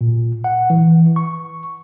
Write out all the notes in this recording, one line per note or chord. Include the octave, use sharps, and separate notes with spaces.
A#2
F#5
E3
C#6